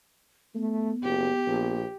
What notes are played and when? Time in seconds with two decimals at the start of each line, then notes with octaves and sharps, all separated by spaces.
0.55 A3 B3
1.03 F#1 G4
1.47 A#1